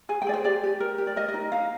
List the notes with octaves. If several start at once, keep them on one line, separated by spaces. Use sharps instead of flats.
G#4 G#5
G5
G#4 D5
C5
G4 D5
G4
A#4
G4
D5
A#4 D#5
D#5
D#4
D#4 F5